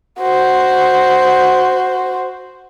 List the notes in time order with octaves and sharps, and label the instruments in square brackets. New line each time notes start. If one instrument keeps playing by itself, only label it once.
[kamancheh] F#4 C5